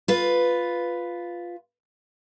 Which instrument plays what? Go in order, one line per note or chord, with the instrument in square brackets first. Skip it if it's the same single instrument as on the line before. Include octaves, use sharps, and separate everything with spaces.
[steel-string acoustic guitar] F4 B4